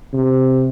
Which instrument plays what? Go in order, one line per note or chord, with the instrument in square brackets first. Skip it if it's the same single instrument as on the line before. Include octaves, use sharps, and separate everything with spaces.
[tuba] C3